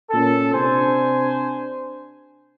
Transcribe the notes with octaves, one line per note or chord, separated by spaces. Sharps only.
A#2 C#4 A4
C3 D4 C5 G#5